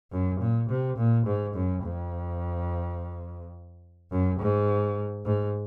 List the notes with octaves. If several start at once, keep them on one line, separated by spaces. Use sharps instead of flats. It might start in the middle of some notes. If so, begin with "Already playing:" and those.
F#2
A#2
C3
A#2
G#2
F#2
F2
F#2
G#2
G#2